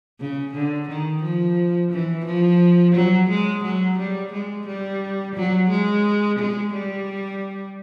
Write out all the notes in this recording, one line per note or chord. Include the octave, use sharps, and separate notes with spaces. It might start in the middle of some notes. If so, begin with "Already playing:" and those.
C#3
D3
D#3
F3
E3
F3
F#3
G#3
F#3
G3
G#3
G3
F#3
G#3
G#3
G3